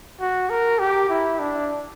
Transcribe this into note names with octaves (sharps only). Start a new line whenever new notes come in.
F#4
A#4
G4
E4
D4